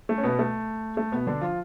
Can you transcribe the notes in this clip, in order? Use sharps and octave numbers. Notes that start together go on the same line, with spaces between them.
A3
C#4
B2 B3
A3
A3
B2 B3
D3 D4
F3 F4